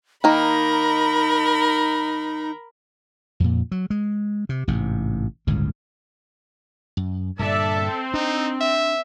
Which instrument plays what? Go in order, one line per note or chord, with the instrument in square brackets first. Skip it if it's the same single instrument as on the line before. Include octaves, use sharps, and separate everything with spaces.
[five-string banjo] D#3 A#3 [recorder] D#4 [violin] A#4 B5
[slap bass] F2 A#2
F#3
G#3
C3
A1 G#2 C3
G1 C#2 A2 C#3
F#2
[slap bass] G2 A#2 D3 [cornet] A4 [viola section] D5 E5 A5
[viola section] C4
[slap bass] D4 [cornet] D#4
[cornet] E5